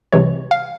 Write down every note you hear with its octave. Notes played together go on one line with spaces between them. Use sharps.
C2 C3 E3 G#3 C#5
F5